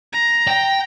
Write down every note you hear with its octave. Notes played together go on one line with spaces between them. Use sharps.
A#5
G5